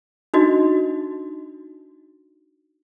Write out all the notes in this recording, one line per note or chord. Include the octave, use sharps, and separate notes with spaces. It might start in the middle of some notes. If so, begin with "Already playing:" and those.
D4 D#4 F#4 D#5